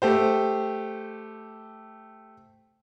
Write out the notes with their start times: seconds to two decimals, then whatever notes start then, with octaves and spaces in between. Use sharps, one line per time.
0.02 A3 G4 C5